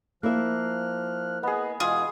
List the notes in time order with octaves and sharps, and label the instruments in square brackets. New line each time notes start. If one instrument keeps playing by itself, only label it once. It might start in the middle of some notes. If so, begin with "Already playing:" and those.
[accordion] F3 F6 F#6 [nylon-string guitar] A#3 E4 E5
[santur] B3 G#4 [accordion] B4 D#5
[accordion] B2 E3 G#3 [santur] F4 [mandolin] G#4